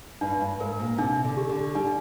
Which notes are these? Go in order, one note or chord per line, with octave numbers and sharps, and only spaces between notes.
G2 D4
G2
G#2 A#4
A#2
C3 D4
D3
G4
D3
G3 D4